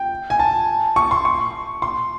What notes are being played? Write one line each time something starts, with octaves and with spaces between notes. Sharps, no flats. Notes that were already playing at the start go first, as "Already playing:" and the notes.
Already playing: G5
G#5
A5
C#6
C6
C#6
C6